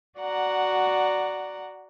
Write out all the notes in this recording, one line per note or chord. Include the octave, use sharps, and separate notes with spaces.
F#4 D5 F#5 A#5